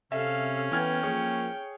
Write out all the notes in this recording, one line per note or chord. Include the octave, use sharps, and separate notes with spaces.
C3 C#4 A4 E5 F5
E3 B3 G5 F6 G#6
F3 A#3 G#4 C#5